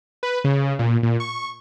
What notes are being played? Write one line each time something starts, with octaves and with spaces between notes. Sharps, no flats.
B4
C#3
A#2
A#2
C#6